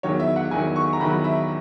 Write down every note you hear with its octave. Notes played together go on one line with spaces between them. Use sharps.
E2 D#3 F#3 C#5
E5
F#5
E2 D#3 F#3 G#5
C#6
A#5
E2 D#3 F#3 B5
E5